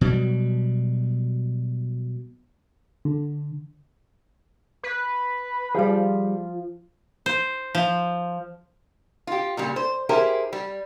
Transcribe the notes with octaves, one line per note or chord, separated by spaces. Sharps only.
B2 F#3 G3
D3
B4
F3 G3 G4 G#4
C5
F3
F4 G4
A#2 C#3 G3
C5
E4 G4 G#4 A#4 C5
G3